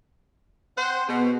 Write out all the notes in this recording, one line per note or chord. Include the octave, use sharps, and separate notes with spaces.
C4 C5 F#5
B2 B3 G#4